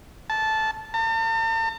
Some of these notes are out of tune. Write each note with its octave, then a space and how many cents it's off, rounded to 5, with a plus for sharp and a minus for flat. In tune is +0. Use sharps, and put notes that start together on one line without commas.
A5 -10
A5 +45